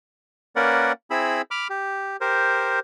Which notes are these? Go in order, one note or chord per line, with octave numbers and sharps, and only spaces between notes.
A#3 C#4 A#4 B4 D5 F#5
C4 E4 G#4 B5 E6
B5 D6 F6
G4
G4 A#4 C5